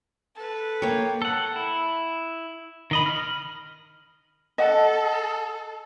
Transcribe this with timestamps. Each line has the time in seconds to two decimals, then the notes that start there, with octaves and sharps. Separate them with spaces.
0.36 A4 B4
0.82 A#3 C#5 G5
1.22 A4 F#5
1.56 E4
2.91 D#3 D#5 B5
3.06 F6
4.58 A4 D#5 F#5 A5